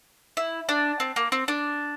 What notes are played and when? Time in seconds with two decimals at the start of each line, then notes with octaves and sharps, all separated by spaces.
0.37 E4
0.69 D4
1.00 C4
1.16 A#3
1.32 C4
1.48 D4